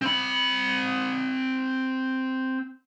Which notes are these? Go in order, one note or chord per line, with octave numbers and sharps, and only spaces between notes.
C4 B5